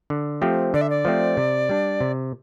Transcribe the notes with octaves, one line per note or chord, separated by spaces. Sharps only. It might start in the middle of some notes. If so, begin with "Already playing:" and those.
D3
F3 A3 C4 G4
D3 D5
E5
D5
F3 A3 C4 G4
C3
G3 D4
C3